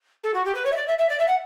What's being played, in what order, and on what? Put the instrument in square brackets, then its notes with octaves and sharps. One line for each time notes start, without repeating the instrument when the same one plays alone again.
[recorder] A4
F#4
G4
B4
C#5
E5
D5
E5
E5
D5
E5
F#5